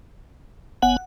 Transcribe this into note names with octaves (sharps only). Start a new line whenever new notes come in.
F#1 B3 F#5 G#5